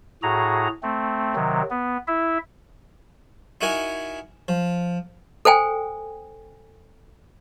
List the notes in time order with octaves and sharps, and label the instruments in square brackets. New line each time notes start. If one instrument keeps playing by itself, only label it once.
[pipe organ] A2 F#4 G#4 A#5
A3 C4
C3 D#3 F#3
B3
E4 E5
[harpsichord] D#4 E4 F#4 A#4 G#5
F3
[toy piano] A4 C5 G5 G#5